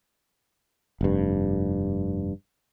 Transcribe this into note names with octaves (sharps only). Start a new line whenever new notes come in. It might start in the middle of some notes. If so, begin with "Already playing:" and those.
F1 G2